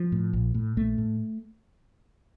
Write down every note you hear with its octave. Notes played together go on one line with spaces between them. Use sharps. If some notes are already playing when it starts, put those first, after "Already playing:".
Already playing: F3
A2
A#1
A2
A#1 A3
A2